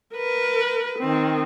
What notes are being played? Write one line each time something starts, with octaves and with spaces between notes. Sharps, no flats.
A#4 B4
D#3 C4